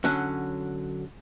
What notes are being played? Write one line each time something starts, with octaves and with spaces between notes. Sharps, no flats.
D3 F#3 C#4